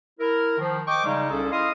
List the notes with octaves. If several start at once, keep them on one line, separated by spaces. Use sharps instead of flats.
E4 A#4
D#3 F3
D#5 G5 C#6 D6
C#3 G3 G#3 D#4
C2 C#4 G#4 A4
E4 D#5 F5 C6 D#6